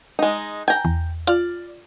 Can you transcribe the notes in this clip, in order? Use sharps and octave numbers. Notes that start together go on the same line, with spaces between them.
G#3 D#4
G5 G#5 A#5 G6
E2
F4 D5 F6